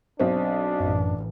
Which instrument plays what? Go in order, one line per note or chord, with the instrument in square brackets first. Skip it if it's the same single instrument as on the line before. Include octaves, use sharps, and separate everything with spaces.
[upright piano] B1 C4 [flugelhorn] D4
[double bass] A1 [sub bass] F#2